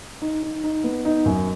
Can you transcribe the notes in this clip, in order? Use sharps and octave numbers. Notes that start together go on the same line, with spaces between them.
D#4
D#4
D#4
B3
D#4
F#2